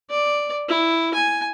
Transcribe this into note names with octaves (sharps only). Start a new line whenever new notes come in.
D5
E4
G#5